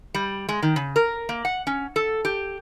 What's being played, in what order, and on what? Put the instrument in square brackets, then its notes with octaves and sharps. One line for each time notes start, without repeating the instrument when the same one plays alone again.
[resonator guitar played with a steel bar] G3
G#3
D#3
C#3
A#4
A#3
F#5
C#4
A4
G4